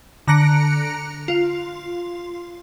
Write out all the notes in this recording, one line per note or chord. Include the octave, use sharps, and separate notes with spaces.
D3 A#5 F#6 A#6 C#7 D7
F4